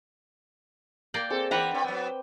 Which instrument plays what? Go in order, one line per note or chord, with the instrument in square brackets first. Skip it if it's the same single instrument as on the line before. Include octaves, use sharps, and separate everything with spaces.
[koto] A#3 D5 G5
[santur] C4 G#4 [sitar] A4
[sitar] E3 [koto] B4 F#5 A#5 [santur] G5 D6
[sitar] C4 D4
F#3 B3